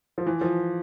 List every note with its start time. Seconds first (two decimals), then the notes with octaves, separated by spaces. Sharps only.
0.18 F3
0.26 E3
0.41 F3